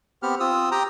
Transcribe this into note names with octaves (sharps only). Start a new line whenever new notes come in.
B3 C4 G4 F6
C4 F4 D#6 E6
G4 G5 A#5 D#6